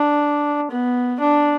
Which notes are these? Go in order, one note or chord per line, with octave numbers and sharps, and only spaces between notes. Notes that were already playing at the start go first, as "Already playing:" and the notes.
Already playing: D4
B3
D4